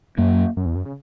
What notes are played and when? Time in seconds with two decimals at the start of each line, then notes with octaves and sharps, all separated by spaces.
0.18 F#2 F#3 A#3
0.57 F#2
0.66 E2
0.75 F#2
0.85 C#3